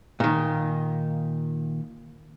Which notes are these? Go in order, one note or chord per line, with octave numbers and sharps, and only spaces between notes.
A#2 D#3